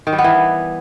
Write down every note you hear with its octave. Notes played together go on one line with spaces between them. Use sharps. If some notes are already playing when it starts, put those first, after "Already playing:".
D#3
G3
B3
E3